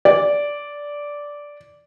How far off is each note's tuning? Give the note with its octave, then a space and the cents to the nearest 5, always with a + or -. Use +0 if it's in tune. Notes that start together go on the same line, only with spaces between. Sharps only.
D5 -10